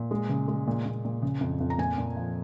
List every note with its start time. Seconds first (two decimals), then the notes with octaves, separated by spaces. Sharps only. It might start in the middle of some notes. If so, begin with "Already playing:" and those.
Already playing: A#2
0.11 G#3
0.29 C#3
0.48 G#3
0.67 A#2
0.86 A#2
1.05 A#2
1.22 C#3
1.41 F2
1.60 F2
1.70 A#5
1.78 A#2 G#5
1.98 A#2
2.16 F3